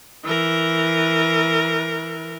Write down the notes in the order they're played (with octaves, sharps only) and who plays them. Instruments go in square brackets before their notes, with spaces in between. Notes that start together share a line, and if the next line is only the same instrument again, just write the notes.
[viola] E3 A#4